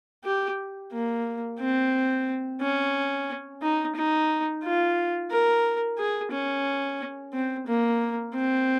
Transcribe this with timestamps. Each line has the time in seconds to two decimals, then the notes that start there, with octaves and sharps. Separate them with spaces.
0.25 G4
0.92 A#3
1.60 C4
2.61 C#4
3.62 D#4
3.96 D#4
4.63 F4
5.31 A#4
5.98 G#4
6.32 C#4
7.33 C4
7.67 A#3
8.34 C4